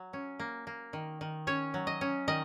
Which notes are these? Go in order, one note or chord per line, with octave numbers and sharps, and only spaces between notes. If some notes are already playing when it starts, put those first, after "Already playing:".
Already playing: F#3
C#4
A#3
A#3
D#3
D#3
C#4 C#5
F#3
D#5
C#4
D#3 D#5